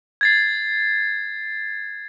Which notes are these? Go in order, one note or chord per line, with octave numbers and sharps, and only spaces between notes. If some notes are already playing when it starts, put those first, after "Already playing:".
G#6 A6 C7